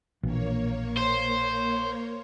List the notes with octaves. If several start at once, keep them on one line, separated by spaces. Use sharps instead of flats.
A#1 B2 E3 A#3 C#5
C5